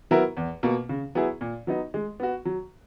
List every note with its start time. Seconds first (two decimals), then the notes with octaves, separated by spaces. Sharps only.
0.11 F#3 B3 E4 A#4
0.37 E2
0.63 B2 A#3
0.89 C#3
1.15 F#3 B3 E4 G#4
1.41 A#2
1.67 F#3 B3 D#4
1.94 G#3
2.20 B3 F#4
2.45 F#3